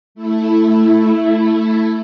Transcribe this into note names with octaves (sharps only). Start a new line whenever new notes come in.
A3 E4